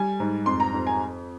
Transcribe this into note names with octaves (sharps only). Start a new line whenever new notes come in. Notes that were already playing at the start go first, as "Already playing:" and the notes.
Already playing: G3 G#5
G#2
F2 C6
A#5
F2
G#5